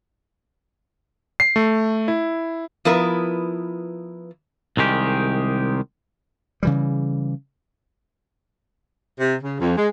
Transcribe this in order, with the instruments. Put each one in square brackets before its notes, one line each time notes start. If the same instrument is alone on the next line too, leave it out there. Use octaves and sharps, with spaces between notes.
[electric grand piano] C7
A3
E4
[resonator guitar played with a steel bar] F3 B3 E4 A#4 B4
[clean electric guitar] C2 D#3 G#3 G4
[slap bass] C#3 E3 G3
[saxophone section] C3
C#3
F2
G#3